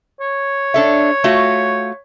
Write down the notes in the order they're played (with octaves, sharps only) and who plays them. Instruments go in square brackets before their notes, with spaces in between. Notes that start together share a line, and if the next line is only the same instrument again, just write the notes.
[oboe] C#5
[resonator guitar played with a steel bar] D4 A4 E5
A3 F4 F#4